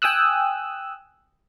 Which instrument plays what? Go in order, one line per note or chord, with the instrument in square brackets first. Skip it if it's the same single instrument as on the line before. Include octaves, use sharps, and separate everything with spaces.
[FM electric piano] G5 G#5 D#6 E6 F#6